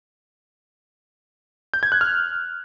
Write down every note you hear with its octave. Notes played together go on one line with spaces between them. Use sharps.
G6
G#6
F#6
F6